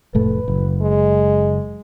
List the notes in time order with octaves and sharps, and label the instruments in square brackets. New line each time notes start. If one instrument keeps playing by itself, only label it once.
[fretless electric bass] F1 A2 A3 [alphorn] B4
[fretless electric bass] F#1
[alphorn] G#3